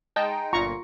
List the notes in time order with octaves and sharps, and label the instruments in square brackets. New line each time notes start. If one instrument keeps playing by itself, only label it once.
[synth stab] G#3 D#4 G5 [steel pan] A5
[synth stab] G1 A#2 [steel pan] F4 A#5 C#6